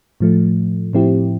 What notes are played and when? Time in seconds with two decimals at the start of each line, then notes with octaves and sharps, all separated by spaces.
0.20 A2 F3 A3
0.93 A2 F3 C4 E4 G4